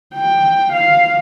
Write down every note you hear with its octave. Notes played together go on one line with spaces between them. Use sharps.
G5
F5